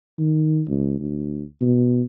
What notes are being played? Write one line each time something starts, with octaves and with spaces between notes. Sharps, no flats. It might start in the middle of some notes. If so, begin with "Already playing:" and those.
D#3
C#2
D2
B2